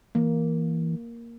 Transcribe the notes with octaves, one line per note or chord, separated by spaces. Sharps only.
E3 A#3